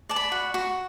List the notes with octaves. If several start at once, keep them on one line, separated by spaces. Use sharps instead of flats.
D5 A5
B5
F#4
F#4